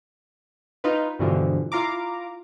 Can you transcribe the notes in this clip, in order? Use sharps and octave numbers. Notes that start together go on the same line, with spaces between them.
D#4 F4 B4
G2 B2 D3 E3 F3
E4 F4 F5 A#5 D6